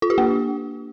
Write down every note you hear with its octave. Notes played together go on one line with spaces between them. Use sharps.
F4
G4
A#3